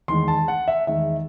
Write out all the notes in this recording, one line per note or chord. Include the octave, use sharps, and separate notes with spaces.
E2 D#3 G#3 C6
A5
F#5
E5
E2 D#3 G#3 E5